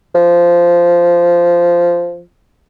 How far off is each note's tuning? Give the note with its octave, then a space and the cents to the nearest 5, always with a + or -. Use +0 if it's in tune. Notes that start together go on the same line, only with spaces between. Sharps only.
F3 -10